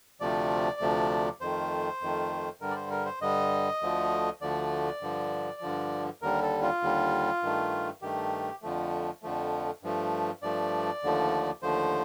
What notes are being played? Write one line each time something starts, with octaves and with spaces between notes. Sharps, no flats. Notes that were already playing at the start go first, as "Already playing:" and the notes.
D2 C3 F3 A3 D5
D2 C3 F3 A3
F2 D#3 A3 C5
F2 D#3 A3
G2 D3 G3 A#4
D5
C5
A#4
C5
G2 D3 G3 D#5
D2 D3 F3 A3
D2 D3 F3 A3 D5
G2 D3 F3
G2 D3 F3
D#2 D3 G3 A#4
A4
F4
D#2 D3 G3
G2 D#3 A3
G2 D#3 A3 G4
F2 D3 F3 A3
F2 D3 F3 A3
G2 F3 A3
G2 F3 A3 D5
D#2 D3 F3 A3
D#2 D3 F3 A3 C5